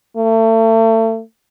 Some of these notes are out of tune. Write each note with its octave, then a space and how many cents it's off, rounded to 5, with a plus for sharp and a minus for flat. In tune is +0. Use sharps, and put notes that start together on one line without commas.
A3 +35